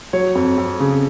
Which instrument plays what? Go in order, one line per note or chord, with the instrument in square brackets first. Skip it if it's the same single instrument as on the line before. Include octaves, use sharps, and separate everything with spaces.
[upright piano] F#3 C#5
F2
F2
C#3